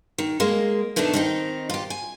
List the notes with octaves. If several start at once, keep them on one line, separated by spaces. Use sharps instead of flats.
D#3
G#3 A#3
B2 D#3 A3 D4 A4
D#3 C4 D#4
F4 G4
G#5